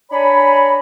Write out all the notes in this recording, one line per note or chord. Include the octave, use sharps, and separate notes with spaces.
D4 C#5 G#5 A#5 B5